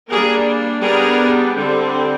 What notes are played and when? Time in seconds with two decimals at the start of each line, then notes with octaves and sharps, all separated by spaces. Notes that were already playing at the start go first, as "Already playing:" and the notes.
0.10 G3 A#3 D4 G#4 A#4
0.82 G3 B3 D4 G#4 A#4
1.55 D3 G3 C4